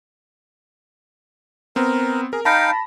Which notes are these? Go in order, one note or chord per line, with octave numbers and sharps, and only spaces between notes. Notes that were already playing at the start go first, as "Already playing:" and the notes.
B3 C4 A#4
G#4 A#4
D#4 F5 G5 A5 B5 A#6